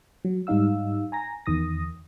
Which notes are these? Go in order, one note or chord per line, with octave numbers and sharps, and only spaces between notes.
F#3
G#2 G3 D#4 F5 E6
G#5 A#5 A#6
E2 D#3 D#6 A#6